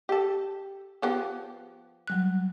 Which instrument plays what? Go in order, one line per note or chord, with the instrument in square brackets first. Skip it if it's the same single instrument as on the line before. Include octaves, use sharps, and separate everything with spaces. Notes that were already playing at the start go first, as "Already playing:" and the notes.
[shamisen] G4 A4
F3 B3 G4
[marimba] F#3 G3 F#6